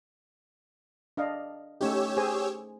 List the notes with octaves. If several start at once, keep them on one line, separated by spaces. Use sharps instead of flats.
D4 D#5 F5
A3 C#4 D#4 G4 C#5 E6
G#4 C5 G#5